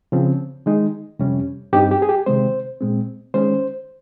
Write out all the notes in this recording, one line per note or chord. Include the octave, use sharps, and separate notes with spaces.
C#3 F3 C4
D#3 G#3 D#4
F2 C3 G3 C#4
G2 G3 C4 D#4 G4
G4
G#4
G4
C3 D#3 G#3 C4 C5
A#2 G#3 C4
D#3 G#3 C#4 C5